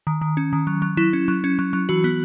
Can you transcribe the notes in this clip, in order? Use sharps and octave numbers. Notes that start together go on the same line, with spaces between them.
D#3
D#3
C#4
D#3
F#3
F#3
F#3 E4
C#4
F#3
C#4
F#3
F#3
E3 F#4
B3